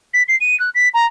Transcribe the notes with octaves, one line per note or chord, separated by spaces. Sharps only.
B6
C7
D#7
F#6
B6
A#5